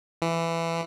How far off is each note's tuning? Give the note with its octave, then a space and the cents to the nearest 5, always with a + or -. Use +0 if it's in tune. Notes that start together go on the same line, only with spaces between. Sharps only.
E3 +15